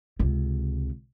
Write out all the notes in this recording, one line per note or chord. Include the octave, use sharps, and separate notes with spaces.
C#2 C3